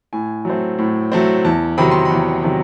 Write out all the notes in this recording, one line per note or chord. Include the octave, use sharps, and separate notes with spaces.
A2 G#5
F#3 A3 C4
A2
F#3 A3 C4
E2 A5
C3 D#3 F#3 B5
C6
B5
E2
C3 D#3 F#3